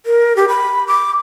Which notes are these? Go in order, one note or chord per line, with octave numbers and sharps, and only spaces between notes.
A#4
G4
B5
D6